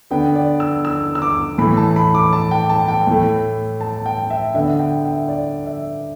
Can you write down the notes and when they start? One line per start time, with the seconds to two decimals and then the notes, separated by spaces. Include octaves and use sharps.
0.11 D3 B3 G5
0.36 D5
0.60 E6
0.85 E6
1.15 E6
1.22 D6
1.58 A2 E3 A3 B5
1.77 A5
1.96 B5
2.15 D6
2.33 A5
2.51 G5
2.70 A5
2.88 G5
3.07 A2 A3
3.81 A5
4.06 G5
4.30 E5
4.54 D3 E5
4.58 B3
4.80 G5
5.05 E5
5.29 D5
5.66 E5